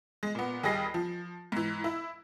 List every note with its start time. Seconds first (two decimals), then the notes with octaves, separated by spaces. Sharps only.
0.23 G#3
0.35 A#2 B3
0.63 D#2 G3 G#4 D#5 A#6 C7
0.94 F3
1.52 G#2 E3
1.84 E4